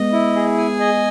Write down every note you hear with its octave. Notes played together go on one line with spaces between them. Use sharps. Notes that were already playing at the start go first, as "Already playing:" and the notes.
Already playing: G#3 B3 D#5
E4
G#4
G#5
D#5